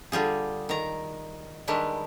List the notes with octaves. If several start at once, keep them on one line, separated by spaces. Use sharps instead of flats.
D3 G3 F4 G#4
D#3 A#5
D#3 G3 G#3 D4 E4 B4